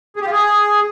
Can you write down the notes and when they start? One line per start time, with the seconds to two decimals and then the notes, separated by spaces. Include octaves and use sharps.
0.16 G#4
0.21 G4
0.26 F4
0.31 G#4